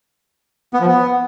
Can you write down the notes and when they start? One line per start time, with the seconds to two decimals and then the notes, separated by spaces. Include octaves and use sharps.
0.73 B3
0.81 F3
0.88 B3